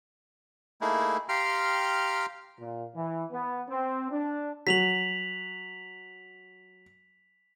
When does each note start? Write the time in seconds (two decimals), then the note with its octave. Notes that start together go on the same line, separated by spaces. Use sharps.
0.81 A3 A#3 D#4 E4 G#4
1.29 G4 F5 G5 A#5 C6 F6
2.59 A#2
2.95 E3
3.32 B3
3.68 C4
4.10 D4
4.67 F#3 B6 F7 F#7